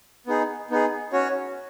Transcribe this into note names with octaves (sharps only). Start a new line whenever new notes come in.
B3 D#4 G#4
B3 D#4 G#4
C#4 F#4 C#5